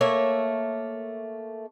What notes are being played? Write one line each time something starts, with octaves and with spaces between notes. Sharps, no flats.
A3 A#3 C#5 E5